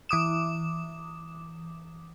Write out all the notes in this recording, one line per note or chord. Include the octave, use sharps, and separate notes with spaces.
E3 D6 D#6 E7